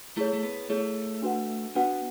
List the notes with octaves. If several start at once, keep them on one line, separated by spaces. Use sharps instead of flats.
A3 E4 G#4 C#5
A3
B3
A3 E4 G#4 C#5
D4 F#4 B4 F#5
B3 D4 F#4 B4 F#5